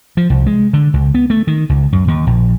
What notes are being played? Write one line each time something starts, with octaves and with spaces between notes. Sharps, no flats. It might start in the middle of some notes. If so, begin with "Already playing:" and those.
F3
C2
G#3
D3
C#2
B3
A3
D#3
C#2
F#2
D#2
A#1